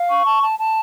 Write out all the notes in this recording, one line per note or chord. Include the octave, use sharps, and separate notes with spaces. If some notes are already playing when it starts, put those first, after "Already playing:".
Already playing: F5
C#6
A5
A5
A5